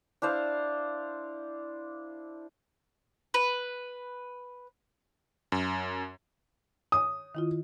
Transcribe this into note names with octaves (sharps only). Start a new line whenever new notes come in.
D4 E4 C5 F5
B4
F#2
C#5 D#6
D#3 E4 F4